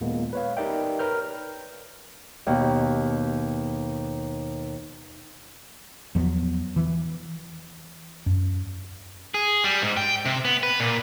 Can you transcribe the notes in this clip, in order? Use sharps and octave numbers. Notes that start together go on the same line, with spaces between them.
D#2 A#2 G#3 A#3 B3
B4 C#5 F5
D#4 G4 A#4 D5 E5 G5
A#4 B4 C#5 F6 G6
D#2 B2
E2 F3 F#3 B3
E3
F#2
G#4
G3
G#2
G5
C3
B3
B4
A#2